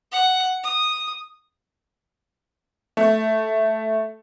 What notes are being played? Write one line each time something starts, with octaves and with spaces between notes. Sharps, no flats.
F#5
D#6
A3